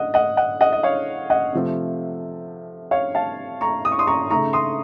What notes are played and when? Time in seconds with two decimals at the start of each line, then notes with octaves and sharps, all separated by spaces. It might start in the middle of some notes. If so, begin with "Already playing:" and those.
Already playing: D#5 F#5
0.14 D#5 F#5
0.37 D#5 F#5
0.61 D#5 F#5
0.73 D#5
0.83 C#5 F5
1.30 D#5 F#5
1.53 C3 F3 A3
2.91 C#5 F5
3.15 F5 A5
3.61 A#5 C#6
3.85 D#6
3.92 C#6
3.99 C6 D#6
4.07 A#5 C#6
4.30 C#3 A3 D#4 A#5 C#6
4.53 C6 D#6